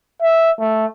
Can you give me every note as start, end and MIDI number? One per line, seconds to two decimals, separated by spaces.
0.23 0.51 76
0.60 0.86 57